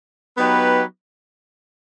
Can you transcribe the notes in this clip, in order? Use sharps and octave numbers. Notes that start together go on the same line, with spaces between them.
F#3 B3 D#4 G4 B4